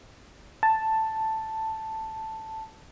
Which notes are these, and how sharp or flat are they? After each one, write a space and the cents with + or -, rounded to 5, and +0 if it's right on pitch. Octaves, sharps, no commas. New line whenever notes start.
A5 +5